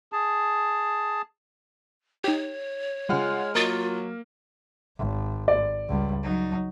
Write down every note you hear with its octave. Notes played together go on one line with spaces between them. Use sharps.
G#4 A5
D#4 G4 C#5
C#3 G3 G#3 F4 F#5 F6
F#3 A#3 F4 A#4 D#5 A6
G#1
D5
C#2 G3
F#3 D#4